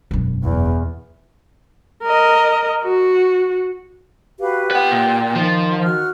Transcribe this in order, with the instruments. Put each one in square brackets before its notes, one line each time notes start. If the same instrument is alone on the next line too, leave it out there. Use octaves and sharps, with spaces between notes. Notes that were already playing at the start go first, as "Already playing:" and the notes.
[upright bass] E1 F#2
[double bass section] E2
[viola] A#4 D#5
F#4
[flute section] F#4 B4 F5 [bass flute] G4
[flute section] F4 G5 [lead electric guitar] B4 F#5
[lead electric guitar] A#2
[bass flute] D#3 [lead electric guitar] F3
[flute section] F#4 F6